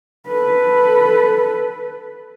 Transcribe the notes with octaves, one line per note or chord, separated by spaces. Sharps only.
A4 B4